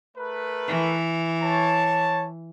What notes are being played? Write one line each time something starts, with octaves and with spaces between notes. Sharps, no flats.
A3 A#4 B4
E3
C#5 A5